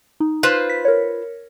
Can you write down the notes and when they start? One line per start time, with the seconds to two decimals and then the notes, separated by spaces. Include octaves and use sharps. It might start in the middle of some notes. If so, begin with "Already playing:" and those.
0.20 D#4
0.43 F4 B4 C5
0.70 B6
0.85 A#4 C#5